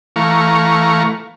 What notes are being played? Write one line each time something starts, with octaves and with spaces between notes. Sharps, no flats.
E3 A3 F5 A#5 C#6